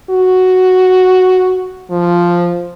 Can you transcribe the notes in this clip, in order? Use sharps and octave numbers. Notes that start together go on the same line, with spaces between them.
F#4
F3